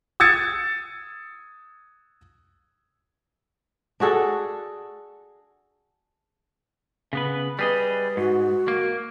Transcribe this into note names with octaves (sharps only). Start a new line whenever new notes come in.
D#6 E6 G#6 A6 C#7
D4 F#4 G#4 A4
C#3 B3 B4
G3 G#4 B4 D#5
G#2 F#4
A#3